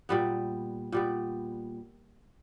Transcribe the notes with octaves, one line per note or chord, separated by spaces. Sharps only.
A#2 G3 B3
A#2 G3 B3